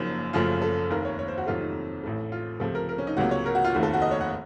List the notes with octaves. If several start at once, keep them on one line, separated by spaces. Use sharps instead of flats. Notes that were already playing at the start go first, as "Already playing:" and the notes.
Already playing: F#1 F#2 F3 A#3 D#4
F#1 F#2 C#3 F3 A3 F4
A4
F1 D#2 D#3 A#4
C#5
C#5
C5
F#4
F2 C3 D#3 F#3 A3 F4
D#4
A1 A2 A3
F4
C#2 C3 F3 A3 A4
A#4
A#4
C#4
D#4
C#2 C3 F#3 A#3 F#4
C#5
A#4
F#4
F4
F1 D#2 D#3 A3 F#4
A4
F#4
D#5
C#5
F#5